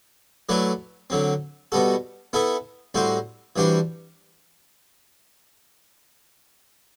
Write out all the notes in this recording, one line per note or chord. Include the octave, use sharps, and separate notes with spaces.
F#3 A3 E4 B4 D5
D3 F#3 C4
B2 G3 B3 F#4 A4
B3 E4 A4 E5
A2 G3 C4 F#4 C5
E3 G3 D4 F#4 C5